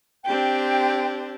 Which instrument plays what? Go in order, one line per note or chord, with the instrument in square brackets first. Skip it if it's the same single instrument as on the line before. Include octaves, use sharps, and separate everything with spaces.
[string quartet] C4 D4 G4 [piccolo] G5